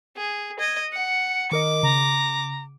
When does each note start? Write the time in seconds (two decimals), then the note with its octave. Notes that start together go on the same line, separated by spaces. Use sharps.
0.17 G#4
0.59 D#5 G#6
0.92 F#5 C#7
1.51 D#3 A#4 D#5 D6
1.83 C#3 A#5